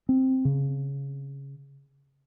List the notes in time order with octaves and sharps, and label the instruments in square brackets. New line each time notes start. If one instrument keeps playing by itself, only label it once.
[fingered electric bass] C4
C#3